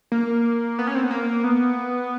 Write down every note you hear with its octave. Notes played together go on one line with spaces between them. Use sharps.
A#3
B3
C#4
C4
B3
A#3
B3